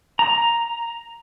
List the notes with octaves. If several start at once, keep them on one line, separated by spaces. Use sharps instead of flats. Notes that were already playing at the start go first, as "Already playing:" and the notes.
A#5